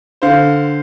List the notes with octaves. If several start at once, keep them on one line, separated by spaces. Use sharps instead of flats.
D3 C5 F5